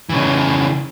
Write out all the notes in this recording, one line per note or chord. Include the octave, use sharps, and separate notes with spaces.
C#3 E3